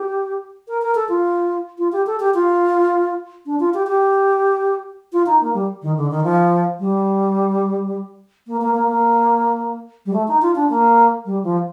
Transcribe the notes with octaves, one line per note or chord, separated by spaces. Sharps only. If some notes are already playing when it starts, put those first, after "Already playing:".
Already playing: G4
A#4
A#4
A4
F4
F4
G4
A4
G4
F4
D4
F4
G4
G4
F4
D#4
A#3
G3
D#3
D3
D#3
F3
G3
A#3
A#3
A#3
A#3
G3
A3
D#4
F4
D4
A#3
G3
F3